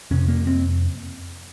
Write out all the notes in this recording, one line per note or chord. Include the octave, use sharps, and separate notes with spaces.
F2 C3 C#4
A#3
C4